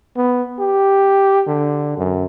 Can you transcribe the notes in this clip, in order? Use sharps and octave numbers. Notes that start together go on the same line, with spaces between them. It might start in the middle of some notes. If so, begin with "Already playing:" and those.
B3
G4
D3
F#2